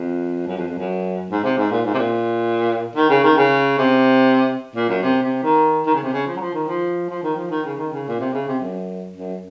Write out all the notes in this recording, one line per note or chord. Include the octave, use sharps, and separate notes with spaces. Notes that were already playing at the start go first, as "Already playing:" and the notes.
Already playing: F2
F#2
F2
F2
F#2
G#2
C3
G#2
A#2
G#2
C3
A#2
D#3
C#3
D#3
C#3
C3
A#2
F#2
C3
C3
D#3
D#3
C#3
C3
C#3
F3
F#3
F3
D#3
F3
F3
D#3
F3
D#3
C#3
D#3
C#3
A#2
C3
C#3
C3
F#2
F#2